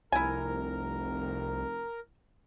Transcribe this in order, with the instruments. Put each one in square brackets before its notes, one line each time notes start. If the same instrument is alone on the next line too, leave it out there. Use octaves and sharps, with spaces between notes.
[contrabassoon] F1 [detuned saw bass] C2 [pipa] E4 G#5 [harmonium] A#4